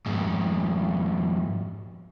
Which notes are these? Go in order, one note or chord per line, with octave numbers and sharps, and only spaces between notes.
F2 G#2